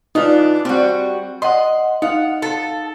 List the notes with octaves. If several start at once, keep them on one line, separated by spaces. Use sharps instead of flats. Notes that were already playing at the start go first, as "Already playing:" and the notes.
E3 D4 D#4 F4
G3 C4 F#4
D#5 F#5 C6
D#4 F5 F#5
A4